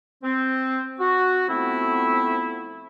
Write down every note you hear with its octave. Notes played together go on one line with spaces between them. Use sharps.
C4
F#4
F3 A3 B3 C4 E4